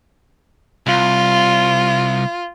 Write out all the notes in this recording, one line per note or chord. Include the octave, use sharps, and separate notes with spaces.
C2 F4